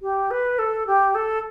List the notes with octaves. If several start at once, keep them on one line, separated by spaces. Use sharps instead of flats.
G4
B4
A4
G4
A4